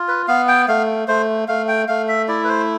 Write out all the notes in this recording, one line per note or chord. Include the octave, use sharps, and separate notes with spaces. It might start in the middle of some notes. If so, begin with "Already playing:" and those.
Already playing: F4
B4
B3 F5
G5
A3 F5
A3 C5
A3 F5
G5
A3 F5
E5
E4 D5
B4
C5